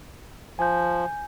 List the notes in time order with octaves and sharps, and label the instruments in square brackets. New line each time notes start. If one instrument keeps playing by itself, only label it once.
[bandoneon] F3 [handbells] G#5 G6